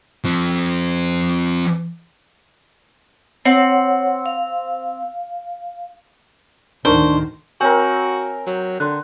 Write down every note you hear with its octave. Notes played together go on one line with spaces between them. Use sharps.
F3 C4
C4 C#5 F#5
F5
D2 A2 D#3 D4 D#4 A#4 C5 C#6
C4 F#4 A#4 C#5 G#5
F#3
D3 C6 F#6